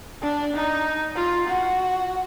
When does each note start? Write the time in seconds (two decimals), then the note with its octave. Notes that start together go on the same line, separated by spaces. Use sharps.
0.22 D4
0.54 D#4
1.16 F4
1.48 F#4